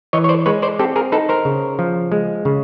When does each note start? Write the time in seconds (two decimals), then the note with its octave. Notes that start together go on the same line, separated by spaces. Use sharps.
0.13 E3 C#5 D#5
0.24 C#5
0.29 C5 D5
0.46 G#3 B4 C#5
0.62 C5 D5
0.79 C4 G4 A4
0.96 G#4 A#4
1.12 D#4 A4 B4
1.29 A#4 C5
1.45 C#3
1.79 F3
2.12 G#3
2.45 C#3